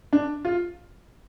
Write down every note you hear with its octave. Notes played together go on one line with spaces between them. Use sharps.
D4
F4